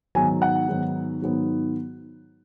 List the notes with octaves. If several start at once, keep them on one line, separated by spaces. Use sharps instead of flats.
G#2 D#3 F#3 B3 G#5
F#5
G#2 D#3 F#3 B3
G#2 D#3 F#3 B3